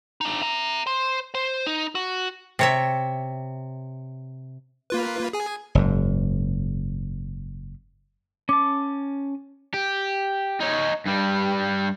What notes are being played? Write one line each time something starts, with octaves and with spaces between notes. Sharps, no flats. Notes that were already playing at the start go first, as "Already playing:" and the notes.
D4 D#4
E5 A#5
C5
C5
D#4
F#4
C3 C#5 E5
A#3 F4 B4
G#4 G#5
F#1 G#2
C#4 A5 D6
G4
D#4 C#5
G2 G3